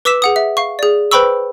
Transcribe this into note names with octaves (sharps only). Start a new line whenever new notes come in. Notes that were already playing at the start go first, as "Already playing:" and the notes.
B4 D6 E6 B6 E7
G#4 F#5 D#6
E5
F5 C#6
G#4 D5
B4 C5 G5 B5 C#6 E6